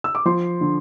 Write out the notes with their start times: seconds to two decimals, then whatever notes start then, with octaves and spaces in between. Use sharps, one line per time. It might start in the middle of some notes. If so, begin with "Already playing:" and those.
0.04 E6
0.15 D6
0.25 F3 C6
0.61 D3